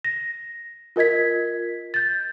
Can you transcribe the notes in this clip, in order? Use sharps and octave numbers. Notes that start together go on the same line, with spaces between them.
A#6
F4 A#4 D#5 G#6 B6
G6 A6